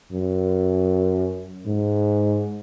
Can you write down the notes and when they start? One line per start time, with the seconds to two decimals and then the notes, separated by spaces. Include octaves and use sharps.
0.12 F#2
1.66 G#2